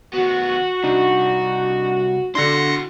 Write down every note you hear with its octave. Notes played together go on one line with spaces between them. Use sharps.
D#3 B3 F#4
C2 D4 D#4
D3 D4 E4 F#4 C6 A#6 C#7